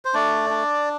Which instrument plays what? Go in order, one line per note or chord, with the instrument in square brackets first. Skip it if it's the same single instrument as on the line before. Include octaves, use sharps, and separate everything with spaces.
[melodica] C5
A3 D4 D5
D4